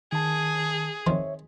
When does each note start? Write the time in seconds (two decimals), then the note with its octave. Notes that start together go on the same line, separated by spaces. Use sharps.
0.12 D#3 G#4 A5
1.07 D#3 F3 C4 C#5 E5